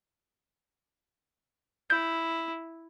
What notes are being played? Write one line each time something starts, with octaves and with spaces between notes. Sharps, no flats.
E4 G6